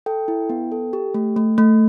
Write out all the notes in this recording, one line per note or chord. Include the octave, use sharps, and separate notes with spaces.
A4 G5
E4
B3
A4
G4
A3
A3
A3